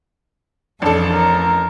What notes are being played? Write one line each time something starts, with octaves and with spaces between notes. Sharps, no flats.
A1 F2 D4 A4
A#4